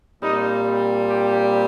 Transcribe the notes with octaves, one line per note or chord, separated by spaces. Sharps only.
A#2 G3 C4 D#4
G4